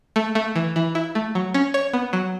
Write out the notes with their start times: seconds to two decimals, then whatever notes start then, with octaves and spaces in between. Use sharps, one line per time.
0.16 A3
0.35 A3
0.56 E3
0.76 E3
0.95 E4
1.15 A3
1.35 F#3
1.54 C#4
1.74 C#5
1.93 B3
2.13 F#3